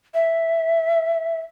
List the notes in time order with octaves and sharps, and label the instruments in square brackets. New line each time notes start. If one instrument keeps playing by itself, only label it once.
[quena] E5